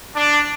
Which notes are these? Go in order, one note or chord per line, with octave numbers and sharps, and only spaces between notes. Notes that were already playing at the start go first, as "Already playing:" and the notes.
D4